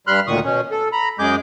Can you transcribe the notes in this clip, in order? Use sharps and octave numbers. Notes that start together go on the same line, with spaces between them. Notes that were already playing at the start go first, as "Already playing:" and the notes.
G2 G3 B5 C6 F6 F#6
D2 A#2 D#3 C#6 D#6
B2 C#4
A4
A#5 B5
F#2 G#3 G#4 D6 G6